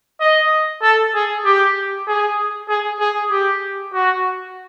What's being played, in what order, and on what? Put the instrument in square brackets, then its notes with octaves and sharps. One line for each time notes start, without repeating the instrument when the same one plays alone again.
[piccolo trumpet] D#5
A4
G#4
G4
G#4
G#4
G#4
G4
F#4